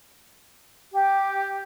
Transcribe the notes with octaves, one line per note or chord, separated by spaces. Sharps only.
G4